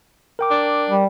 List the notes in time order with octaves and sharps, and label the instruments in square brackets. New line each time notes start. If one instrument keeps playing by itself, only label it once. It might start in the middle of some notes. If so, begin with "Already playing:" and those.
[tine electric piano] A#4 G5 D6
[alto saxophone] D4
[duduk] G3